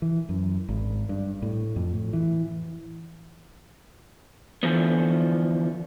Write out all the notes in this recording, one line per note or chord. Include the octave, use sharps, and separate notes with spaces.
E3
F#2
G#1
G2
A2
F2
A2
E3
D3 E3 F3 B3